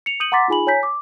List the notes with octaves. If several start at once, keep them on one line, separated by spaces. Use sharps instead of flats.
C#7 F7
D#6 G6 C#7 D#7 F#7
F#5 A#5 C6 D6 A6 B6
D#4 F4 G#4 G#5 B5 F#7
C#5 G#5 A#5 G6 B6
D6